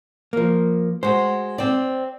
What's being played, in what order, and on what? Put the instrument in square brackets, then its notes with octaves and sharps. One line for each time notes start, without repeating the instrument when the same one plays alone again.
[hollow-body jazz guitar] F3 A#3
[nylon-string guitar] G#3 F#4 [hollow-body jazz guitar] C5
[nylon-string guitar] C4 D5